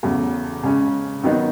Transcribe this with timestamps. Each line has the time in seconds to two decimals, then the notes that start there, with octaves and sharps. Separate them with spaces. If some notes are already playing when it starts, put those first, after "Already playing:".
0.03 E2 C#3 F#3 A3
0.63 C#3 G#3 C#4
1.23 D#3 F#3 B3 D#4